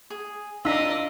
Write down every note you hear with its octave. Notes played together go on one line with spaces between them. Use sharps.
G#4
D4 F4 A#4 D5 D#5 E6 B6